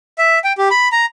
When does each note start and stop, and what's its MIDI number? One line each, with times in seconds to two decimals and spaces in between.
0.18 0.39 76
0.44 0.53 79
0.58 0.69 67
0.71 0.88 83
0.92 1.06 82